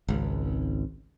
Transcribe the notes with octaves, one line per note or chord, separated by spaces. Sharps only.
G#1 C#2